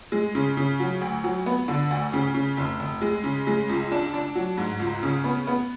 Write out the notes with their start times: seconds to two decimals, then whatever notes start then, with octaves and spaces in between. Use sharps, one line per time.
0.12 G#3
0.35 C#3
0.57 C#3
0.80 F#3
1.01 D2
1.24 F#3
1.46 B3
1.68 D3
1.91 D2
2.13 C#3
2.34 C#3
2.57 F1
2.80 F1
3.02 G#3
3.24 C#3
3.47 G#3
3.69 C#2
3.92 D4
4.14 D4
4.35 F#3
4.57 G#2
4.79 C#2
5.03 C#3
5.24 B3
5.47 B3